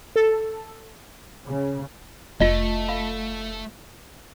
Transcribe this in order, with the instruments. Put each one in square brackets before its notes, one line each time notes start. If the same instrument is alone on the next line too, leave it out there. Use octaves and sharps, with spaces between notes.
[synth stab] A4
[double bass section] C#3
[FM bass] F1 [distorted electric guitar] A3 [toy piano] F4 D#5
[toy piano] F5 B5